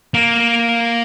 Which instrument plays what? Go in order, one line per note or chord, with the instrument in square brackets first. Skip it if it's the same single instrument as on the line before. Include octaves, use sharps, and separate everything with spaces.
[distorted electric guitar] A#3